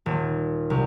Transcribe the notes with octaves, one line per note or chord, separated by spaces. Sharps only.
D#1
C2